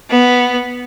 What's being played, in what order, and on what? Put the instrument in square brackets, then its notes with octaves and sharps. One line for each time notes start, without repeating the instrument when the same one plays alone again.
[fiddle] B3